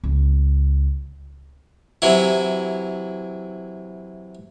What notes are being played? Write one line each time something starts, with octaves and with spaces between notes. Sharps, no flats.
C#2
C3 E3 F#3 E4